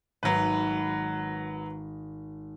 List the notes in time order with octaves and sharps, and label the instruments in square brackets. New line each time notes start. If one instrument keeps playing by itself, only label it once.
[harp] G#1 [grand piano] F#3 B4